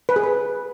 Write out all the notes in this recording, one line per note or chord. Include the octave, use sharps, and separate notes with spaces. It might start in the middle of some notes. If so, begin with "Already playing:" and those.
B4
G#4
B4